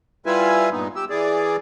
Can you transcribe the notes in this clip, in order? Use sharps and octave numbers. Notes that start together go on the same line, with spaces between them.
G3 E4 F4 B4 E5 G#5
G2 A#2 B3 D#4
G4 E6
E3 G#4 D5